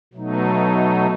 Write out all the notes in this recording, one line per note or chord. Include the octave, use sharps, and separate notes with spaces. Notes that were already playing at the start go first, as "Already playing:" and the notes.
B2 F#3 A3 D#4